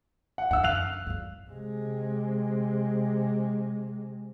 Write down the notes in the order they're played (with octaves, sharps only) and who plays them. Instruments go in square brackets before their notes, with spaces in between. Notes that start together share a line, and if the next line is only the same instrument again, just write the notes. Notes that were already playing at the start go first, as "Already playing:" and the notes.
[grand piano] F#5
[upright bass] D4 D#4 [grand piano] F#5 E6
[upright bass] F#2 D3 [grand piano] F5 F#6 F7
[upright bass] G2 G3
[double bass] C3 G#3